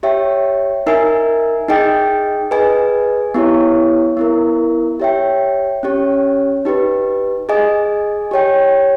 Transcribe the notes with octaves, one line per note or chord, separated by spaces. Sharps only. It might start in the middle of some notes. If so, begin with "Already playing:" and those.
G4 C#5 E5 G5
D#4 A#4 E5 G#5
D#4 G#4 D#5 G5
G#4 B4 D#5 G#5
B3 E4 G4 C#5
B3 E4 A#4
G4 C#5 E5 G5
C#4 G4 C#5
D#4 G4 B4
G#4 D#5 G#5
G4 C#5 G5